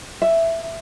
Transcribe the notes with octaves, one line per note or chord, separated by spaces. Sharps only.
E5